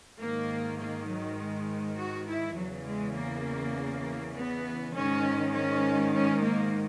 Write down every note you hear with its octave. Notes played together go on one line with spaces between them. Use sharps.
G#2 D#3 A#3
A#3
F#3
G#3
F#4
E4
E2 C#3 E3 F#3
G#3
A#3
B3
G#2 D#3 C#4
C#4
C#4
A#3